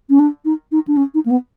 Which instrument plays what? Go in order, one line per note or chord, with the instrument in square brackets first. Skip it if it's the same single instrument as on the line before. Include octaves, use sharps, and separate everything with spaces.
[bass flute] C#4
D4
D#4
D#4
D4
C#4
D#4
A#3
B3